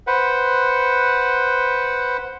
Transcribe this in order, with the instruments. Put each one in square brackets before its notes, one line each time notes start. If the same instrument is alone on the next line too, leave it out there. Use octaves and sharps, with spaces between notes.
[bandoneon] B4 C5 F#5